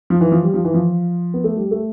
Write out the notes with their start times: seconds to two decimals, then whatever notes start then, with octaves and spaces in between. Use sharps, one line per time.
0.10 F3
0.21 E3
0.32 F3
0.43 G3
0.54 F3
0.65 E3
0.74 F3
1.34 B3
1.44 A3
1.57 G3
1.71 A3